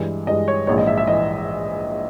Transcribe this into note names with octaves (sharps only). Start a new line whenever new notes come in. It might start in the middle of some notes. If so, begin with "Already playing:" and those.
Already playing: G2 E3 G#3
G2 E3 G#3 D#5
C#5
A#1 G#2 E3 C#5
D#5
E5
E5
E3 D#5